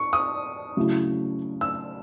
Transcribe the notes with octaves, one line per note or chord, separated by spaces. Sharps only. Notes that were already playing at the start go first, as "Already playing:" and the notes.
Already playing: C#6
D#6
C#3 F#3 A3 E4
E6